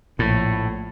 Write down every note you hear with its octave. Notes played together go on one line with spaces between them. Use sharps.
A#1 A2